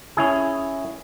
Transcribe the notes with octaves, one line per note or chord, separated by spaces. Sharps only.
C#4 E4 G#4